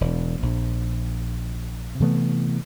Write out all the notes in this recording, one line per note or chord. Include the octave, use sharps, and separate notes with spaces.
E1
A#1
C3 E3 A3 B3